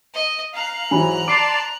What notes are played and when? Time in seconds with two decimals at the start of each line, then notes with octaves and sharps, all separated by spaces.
0.14 D#5
0.54 F5 A#5 F#6
0.91 G#2 E3 F#3 G#5 B5
1.28 D5 A5 C6 D6 C7 D7